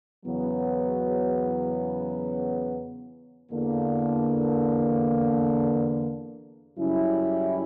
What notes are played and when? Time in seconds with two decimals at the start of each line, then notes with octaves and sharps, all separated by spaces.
0.25 E2 C#3 F#3 B3
3.51 E2 D3 A#3
6.77 F#2 C#3 G3 C#4 E4